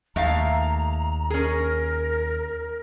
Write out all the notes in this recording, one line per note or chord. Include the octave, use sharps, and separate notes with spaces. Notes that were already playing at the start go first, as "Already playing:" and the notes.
D#2 A3 E5 F5 A#5
C#4 G#4 A#4